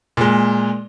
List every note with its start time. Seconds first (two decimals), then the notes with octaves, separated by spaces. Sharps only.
0.17 A#2 G#3